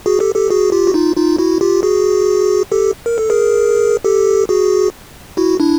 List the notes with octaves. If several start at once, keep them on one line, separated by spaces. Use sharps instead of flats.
F#4 G#4
G4 A4
G4 A4
F#4 G#4
F4 G4
F#4
D#4 F4
D#4 F4
E4 F#4
F4 G4
F#4 G#4
G4 A4
A#4
A4
G#4 A#4
G4 A4
F#4 G#4
E4 F#4
D4 E4